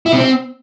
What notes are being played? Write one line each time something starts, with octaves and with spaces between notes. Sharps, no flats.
E4
C3
C4